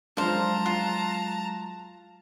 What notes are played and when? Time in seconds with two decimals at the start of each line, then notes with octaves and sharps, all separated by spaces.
0.17 F3 F#3 G#3 D4 C5 F5 A5 A#5
0.66 F4 F#6